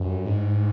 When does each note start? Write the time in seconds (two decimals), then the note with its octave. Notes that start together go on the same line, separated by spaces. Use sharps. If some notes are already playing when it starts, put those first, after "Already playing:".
Already playing: F#2
0.26 G#2